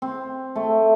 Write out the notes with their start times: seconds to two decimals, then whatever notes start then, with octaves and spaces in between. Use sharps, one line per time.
0.02 C4
0.56 A3